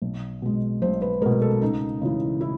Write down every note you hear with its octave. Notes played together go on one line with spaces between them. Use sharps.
B1
B2 G#3
B1 C5
B4
B2 G#3 A#4
A4
C#2 D#4
C#3 E3
E4